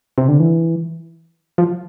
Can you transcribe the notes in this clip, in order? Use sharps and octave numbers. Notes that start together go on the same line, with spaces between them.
C3
D3
E3
F3